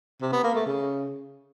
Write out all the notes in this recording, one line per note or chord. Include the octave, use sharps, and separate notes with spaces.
C3
B3
A#3
A3
C#3